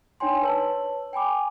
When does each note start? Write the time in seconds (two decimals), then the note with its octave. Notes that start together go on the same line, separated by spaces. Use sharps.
0.20 D4 D#4 C#5 G5 G#5 C6
0.42 B4 C#5 A5 E6 F#7
1.13 G5 G#5 B5 D6